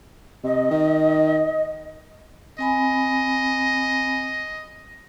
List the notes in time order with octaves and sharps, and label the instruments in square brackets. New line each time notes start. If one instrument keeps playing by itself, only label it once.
[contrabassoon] C3 [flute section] D#5
[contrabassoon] D#3
[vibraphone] C4 G#5 B5 [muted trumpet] D#5